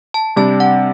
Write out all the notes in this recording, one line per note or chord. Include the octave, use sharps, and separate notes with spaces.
A5
C3 G3 D4 A5
F#5